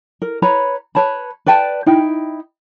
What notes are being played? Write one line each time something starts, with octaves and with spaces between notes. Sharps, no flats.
A#4
B4 C#5 A#5 B5
B4 C#5 A5 B5
B4 D5 G5 A5
D#4 E4 G5